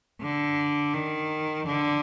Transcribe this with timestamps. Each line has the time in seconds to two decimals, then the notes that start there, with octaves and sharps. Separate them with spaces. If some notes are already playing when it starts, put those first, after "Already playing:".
0.22 D3
0.94 D#3
1.67 D3